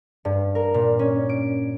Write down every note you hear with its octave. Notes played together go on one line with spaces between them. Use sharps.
G2
A#4
A#2
C#4
D7